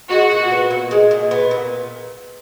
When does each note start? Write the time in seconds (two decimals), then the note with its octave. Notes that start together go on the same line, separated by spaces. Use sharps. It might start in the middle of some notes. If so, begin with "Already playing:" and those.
0.10 G#3 F#4
0.31 A#2
0.51 B3
0.71 A#2
0.91 G#3
1.11 A#2
1.31 B3
1.51 A#2